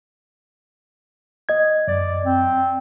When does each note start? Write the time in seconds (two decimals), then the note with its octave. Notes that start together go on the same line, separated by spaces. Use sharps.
1.49 D#5 G#6
1.88 F#2 D5
2.25 C4